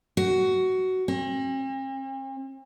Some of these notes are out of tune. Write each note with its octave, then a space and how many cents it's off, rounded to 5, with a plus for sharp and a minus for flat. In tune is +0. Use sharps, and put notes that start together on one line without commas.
F#4 +15
C4 +45